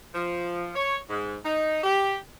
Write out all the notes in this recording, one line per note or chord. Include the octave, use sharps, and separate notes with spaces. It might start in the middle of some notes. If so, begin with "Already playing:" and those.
F3
C#5
G#2
D#4
G4